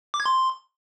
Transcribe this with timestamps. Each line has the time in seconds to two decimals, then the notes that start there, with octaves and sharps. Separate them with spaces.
0.14 D6
0.20 G#6
0.26 C6